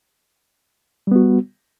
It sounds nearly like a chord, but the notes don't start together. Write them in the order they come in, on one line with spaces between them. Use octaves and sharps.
G3 B3 F#4